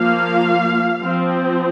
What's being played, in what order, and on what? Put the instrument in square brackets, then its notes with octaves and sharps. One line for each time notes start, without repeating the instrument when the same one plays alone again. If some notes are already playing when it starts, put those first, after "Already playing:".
Already playing: [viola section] F3 A#3 F5
F3 C4